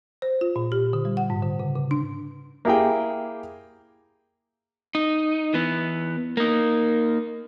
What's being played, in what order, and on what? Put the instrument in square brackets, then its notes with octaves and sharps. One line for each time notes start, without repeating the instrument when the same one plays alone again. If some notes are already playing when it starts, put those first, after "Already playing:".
[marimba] C5
F4
A#2
G4
D3
G3
F#5
G#2
D3
C#3
C#3
D4
[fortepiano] A#3 E4 G4 G#4 G5
[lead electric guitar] D#4
E3 B3
A#3 D#4